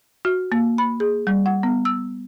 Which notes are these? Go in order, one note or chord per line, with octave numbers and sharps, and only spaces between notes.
F#4
A#3
B5
G#4
G3
F#5
B3
E6